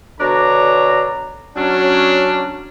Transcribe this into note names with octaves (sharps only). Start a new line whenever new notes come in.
B2 D3 D4 C#5 A#5
F#3 C#4 D4